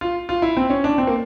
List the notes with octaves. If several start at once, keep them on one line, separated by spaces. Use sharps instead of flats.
F4
F4
E4
C4
C#4
D4
C4
A#3